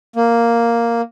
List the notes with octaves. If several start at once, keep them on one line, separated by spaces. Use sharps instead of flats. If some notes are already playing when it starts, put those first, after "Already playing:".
A#3